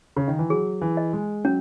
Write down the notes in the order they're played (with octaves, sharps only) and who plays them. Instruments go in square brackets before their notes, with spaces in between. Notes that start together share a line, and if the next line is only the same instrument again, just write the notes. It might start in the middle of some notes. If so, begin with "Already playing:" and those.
[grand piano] C#3
D#3
E3
[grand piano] F#3 [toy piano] G#4
[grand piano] E3
[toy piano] D#5
[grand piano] G#3
[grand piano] F#3 [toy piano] C#4